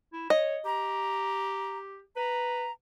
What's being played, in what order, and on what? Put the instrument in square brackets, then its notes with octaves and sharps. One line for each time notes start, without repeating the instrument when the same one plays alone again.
[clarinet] E4
[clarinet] C#5 [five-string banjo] D#5
[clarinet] G4 [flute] A#5
[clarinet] B4 [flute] A#5